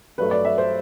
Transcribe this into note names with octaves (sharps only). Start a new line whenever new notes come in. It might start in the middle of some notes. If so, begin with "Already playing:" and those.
G2 F#3 A3 B4
D5
E5
C5